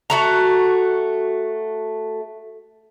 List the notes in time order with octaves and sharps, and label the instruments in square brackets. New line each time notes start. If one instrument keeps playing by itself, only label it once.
[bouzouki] A3 F#4 A#5